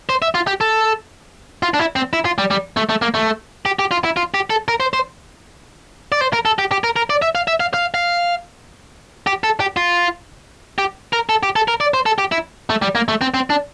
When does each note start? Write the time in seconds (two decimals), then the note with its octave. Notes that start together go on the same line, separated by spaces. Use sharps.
0.09 C5
0.22 E5
0.35 F4
0.47 G4
0.61 A4
1.63 F4
1.74 D4
1.79 E4
1.96 C4
2.13 E4
2.25 F4
2.38 G3
2.51 G3
2.77 A3
2.89 A3
3.02 A#3
3.14 A3
3.65 G4
3.79 G4
3.91 F4
4.04 E4
4.16 F4
4.34 G4
4.50 A4
4.68 A#4
4.80 C5
4.93 C5
6.12 D5
6.21 C5
6.33 A#4
6.45 A4
6.59 G4
6.71 G4
6.84 A#4
6.96 A#4
7.10 D5
7.22 E5
7.35 F5
7.48 E5
7.60 F5
7.74 F5
7.94 F5
9.27 G4
9.44 A4
9.60 G4
9.76 F4
10.78 G4
11.13 A#4
11.29 A4
11.43 G4
11.56 A4
11.68 A#4
11.81 D5
11.94 C5
12.06 A4
12.18 G4
12.32 E4
12.70 A3
12.82 G3
12.95 A#3
13.08 A3
13.21 C4
13.34 C4
13.50 D4